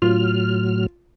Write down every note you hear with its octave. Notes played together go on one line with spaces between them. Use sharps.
A2 F#3 F4 F6